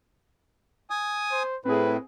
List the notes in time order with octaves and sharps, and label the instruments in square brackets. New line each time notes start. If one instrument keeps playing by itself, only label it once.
[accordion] G#5 D#6
[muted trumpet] C5
[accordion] A2 [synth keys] C4 G#4 [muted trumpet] B4